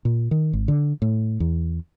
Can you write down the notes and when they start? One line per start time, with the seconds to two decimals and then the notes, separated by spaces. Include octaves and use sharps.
0.05 A#2
0.31 D#3
0.53 G#1
0.68 D3
1.02 A2
1.40 E2